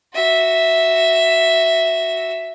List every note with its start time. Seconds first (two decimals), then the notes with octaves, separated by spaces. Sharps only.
0.14 F#4 E5